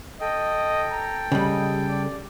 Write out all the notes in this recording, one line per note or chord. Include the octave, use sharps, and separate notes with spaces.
A4 D#5 G5
A#5
C#3 G3 D#5
D5